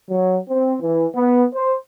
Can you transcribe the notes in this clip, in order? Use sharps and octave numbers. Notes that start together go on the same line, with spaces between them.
F#3
C4
E3
B3
C5